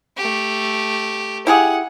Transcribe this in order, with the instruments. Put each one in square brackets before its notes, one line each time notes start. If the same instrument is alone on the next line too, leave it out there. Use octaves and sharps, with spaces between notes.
[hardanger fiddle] A3 G4
[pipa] E4 G4 G#4 [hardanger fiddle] F#5